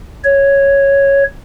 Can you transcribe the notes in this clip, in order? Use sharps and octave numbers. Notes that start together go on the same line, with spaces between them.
C#5